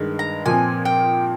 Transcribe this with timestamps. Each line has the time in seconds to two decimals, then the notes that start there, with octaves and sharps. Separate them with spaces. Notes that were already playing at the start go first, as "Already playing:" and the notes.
Already playing: G2 D#3 G#3
0.19 A#5
0.46 A#2 F3 C4 G#5
0.85 G5